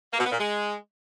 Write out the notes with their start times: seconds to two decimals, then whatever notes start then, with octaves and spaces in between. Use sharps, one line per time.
0.12 A#3
0.18 B2
0.25 B3
0.31 A#2
0.38 G#3